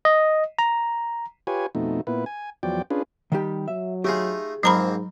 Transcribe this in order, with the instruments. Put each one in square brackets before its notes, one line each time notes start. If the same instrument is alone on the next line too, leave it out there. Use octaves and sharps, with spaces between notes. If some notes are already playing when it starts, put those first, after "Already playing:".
[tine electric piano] D#5
A#5
[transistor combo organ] F4 G4 B4 C#5 G#5
F2 B2 A3 D#4
A#2 B3 E4 B4
G#5
E2 F3 F#3 D5 G5
C#4 D4 F4 G#4 B4
[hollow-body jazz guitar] D#3 G3 G4
[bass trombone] F#3 [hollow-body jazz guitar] E5
[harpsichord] A3 D#4 F4 [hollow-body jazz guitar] G4 G#4
[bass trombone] G#2 [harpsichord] F3 A#3 C4 [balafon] F#3 A#5 B5